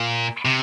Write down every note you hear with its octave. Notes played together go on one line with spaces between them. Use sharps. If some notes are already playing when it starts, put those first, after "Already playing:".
Already playing: A#2
C3